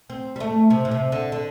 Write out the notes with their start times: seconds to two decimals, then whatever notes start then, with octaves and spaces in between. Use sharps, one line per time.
0.10 C4
0.36 G3
0.40 A3
0.70 C3
0.85 A2
0.91 C3
1.12 D3
1.32 D3